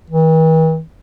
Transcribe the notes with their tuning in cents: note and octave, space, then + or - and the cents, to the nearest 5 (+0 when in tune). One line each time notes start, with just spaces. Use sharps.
E3 -45